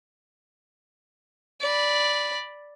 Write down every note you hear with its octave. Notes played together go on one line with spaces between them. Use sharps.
D5 B5